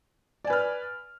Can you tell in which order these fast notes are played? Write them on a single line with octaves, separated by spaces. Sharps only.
D5 G#5 B4 F6